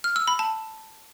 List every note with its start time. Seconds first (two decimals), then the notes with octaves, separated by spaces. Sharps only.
0.04 F6
0.16 E6
0.28 B5
0.39 A5